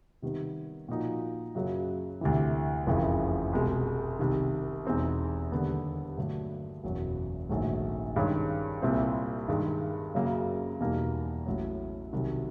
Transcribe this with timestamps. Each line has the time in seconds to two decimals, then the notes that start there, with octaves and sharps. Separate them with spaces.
0.22 C3 D#3 G3 B3
0.89 A#2 F3 A#3 D#4 F#4
1.55 F#2 C#3 F#3
2.21 D2 C3 E3
2.87 F#1 F2 C#3 E3
3.53 C2 B2 G#3
4.19 C2 C3 D#3
4.86 E2 B2 G#3 C4 D#4
5.52 D#2 D3 G3 B3
6.17 G2 D3 F#3 A3 D4
6.84 F#1 E2 B2 F#3
7.49 A#1 G#2 D#3 F#3 A3
8.16 G2 D#3 G#3 C#4
8.82 C2 A#2 G3 C4 E4
9.48 G2 D#3 G#3
10.15 F#2 C#3 F#3 A#3
10.81 E2 B2 G3 A#3 D#4
11.46 A1 A2 F#3
12.13 C2 C3 D#3 F#3